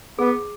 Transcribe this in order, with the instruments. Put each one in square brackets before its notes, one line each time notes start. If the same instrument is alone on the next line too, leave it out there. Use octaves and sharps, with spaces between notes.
[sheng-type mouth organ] B3 [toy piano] G#4